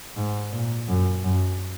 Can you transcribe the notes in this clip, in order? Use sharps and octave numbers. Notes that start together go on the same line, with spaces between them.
G#2
A#2
F#2
F#2